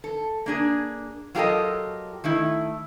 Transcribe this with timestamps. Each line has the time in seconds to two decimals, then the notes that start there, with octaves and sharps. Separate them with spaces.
0.04 A4
0.46 A#3 D4 G#4
1.35 F#3 F4 G4 A4 A#4 D#5
2.24 D#3 A3 E4